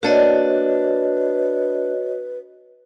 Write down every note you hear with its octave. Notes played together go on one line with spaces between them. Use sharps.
A#3 D4 F#4 B4 C#5 D#5